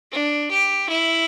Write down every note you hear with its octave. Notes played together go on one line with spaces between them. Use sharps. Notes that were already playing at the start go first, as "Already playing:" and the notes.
D4
G4
E4